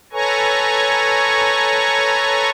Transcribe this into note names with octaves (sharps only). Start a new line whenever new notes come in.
A4 B4 C#5 G#5 A#5 C#6